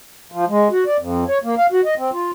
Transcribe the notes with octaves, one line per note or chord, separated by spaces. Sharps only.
F3
G#3
F#4
D5
F2
C#5
A#3
F5
F#4
D#5
C4
F4